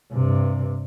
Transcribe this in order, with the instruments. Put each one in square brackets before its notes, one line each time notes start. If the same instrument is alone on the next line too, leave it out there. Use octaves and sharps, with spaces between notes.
[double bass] G2 C3